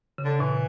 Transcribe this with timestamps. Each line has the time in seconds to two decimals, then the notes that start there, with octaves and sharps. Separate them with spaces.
0.18 C#3
0.24 D3
0.39 A#2 E3